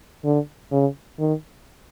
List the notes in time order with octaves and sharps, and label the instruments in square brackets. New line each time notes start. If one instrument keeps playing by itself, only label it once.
[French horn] D3
C#3
D#3